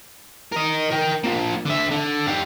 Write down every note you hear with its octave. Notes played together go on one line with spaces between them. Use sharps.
A#4 D#5
A#4 G5
F3 A#3
D3 E5
D3
G4 F5